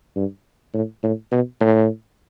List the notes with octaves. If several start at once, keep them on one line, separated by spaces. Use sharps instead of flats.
G2
A2
A2
B2
A2